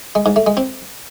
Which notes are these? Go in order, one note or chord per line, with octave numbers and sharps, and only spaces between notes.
G#3
G#2
A3
G#3
C4